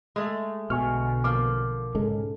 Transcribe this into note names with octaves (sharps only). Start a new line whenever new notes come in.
G#3 A3
B1 B2 D3 G#5 C#6 F6
F3 A#3 D6
G#2 C#3 G#3 A4